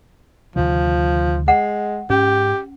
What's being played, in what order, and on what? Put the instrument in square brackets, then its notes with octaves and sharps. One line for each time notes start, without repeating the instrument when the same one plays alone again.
[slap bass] D2 C3 D#3 [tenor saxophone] F3
[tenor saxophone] G#3 [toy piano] F#5
[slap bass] G#2 [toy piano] C#4 [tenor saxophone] G4